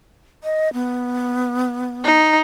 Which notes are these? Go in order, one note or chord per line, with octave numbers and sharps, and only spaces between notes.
D#5
B3
D#4